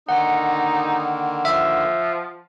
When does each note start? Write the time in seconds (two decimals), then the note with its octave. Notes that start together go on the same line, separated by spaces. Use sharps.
0.09 D3 D#3 A#3 D#4 F#5
1.45 F3 E5